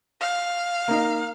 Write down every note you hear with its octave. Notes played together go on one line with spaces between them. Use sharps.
F5
A#3 D#4